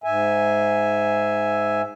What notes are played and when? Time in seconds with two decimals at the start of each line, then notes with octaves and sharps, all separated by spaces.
0.04 G#2 E5 G#5